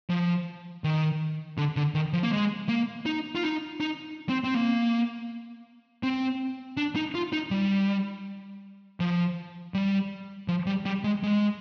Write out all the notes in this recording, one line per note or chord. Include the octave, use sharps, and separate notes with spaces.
F3
D#3
D3
D3
D#3
F3
A#3
G#3
A#3
D#4
F4
D#4
D#4
C4
C4
A#3
C4
D4
D#4
F4
D#4
G3
F3
G3
F3
G3
G3
G#3
G#3